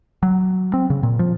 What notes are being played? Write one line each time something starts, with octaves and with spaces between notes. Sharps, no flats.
F#3
C4
C#3
A#2
F3